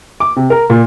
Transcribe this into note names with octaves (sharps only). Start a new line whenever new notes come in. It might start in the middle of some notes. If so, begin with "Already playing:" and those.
D6
C3
A#4
A#2